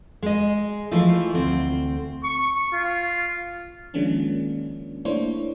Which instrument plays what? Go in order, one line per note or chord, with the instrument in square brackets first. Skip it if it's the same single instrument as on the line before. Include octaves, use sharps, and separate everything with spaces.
[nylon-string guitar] G#3 D#5
E3 F3 A3 C5
D2 C4
[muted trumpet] C#6
F4
[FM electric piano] D#3 F3 G#3 A#3 C#4 D4
A3 A#3 D4 E4 C5 C#5